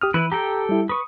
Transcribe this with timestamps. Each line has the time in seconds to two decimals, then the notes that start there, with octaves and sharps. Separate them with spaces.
0.01 G4 D#6 F6
0.14 E3 E4 B4
0.32 G4 A4 G5 A#5
0.69 G3 E4
0.89 B4 C#6 D#6